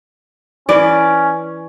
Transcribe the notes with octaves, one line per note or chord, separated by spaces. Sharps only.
E3 C#4 D5